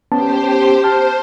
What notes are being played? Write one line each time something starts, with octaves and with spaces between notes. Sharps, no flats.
B3 C#4 G4 C5 A5
C5 A5 F6